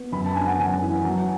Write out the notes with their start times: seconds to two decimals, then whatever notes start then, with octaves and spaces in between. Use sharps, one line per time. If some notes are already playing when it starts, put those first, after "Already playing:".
Already playing: B3
0.12 F#2 B5
0.25 A5
0.35 D4 G#5
0.47 F#5
0.59 F#2 G#5
0.83 E3
1.05 F#3